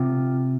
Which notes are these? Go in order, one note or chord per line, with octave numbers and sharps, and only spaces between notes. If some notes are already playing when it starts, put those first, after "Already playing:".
Already playing: C3 F4